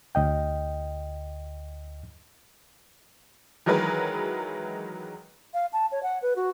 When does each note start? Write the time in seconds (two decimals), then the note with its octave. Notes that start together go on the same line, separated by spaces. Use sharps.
0.15 D2 D#5 G5
3.66 D#3 E3 F#3 G#3 A#4 B4
5.54 F5
5.73 A5
5.92 C#5
6.03 F#5
6.22 B4
6.36 F#4